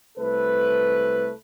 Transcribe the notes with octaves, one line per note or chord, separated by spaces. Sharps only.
C2 A3 A4 B4